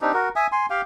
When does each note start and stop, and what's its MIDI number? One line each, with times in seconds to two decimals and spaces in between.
0.01 0.12 60
0.01 0.12 62
0.01 0.12 63
0.01 0.12 67
0.13 0.29 66
0.13 0.29 70
0.36 0.47 76
0.36 0.47 80
0.36 0.47 87
0.52 0.66 80
0.52 0.66 84
0.70 0.82 67
0.70 0.82 77
0.70 0.82 79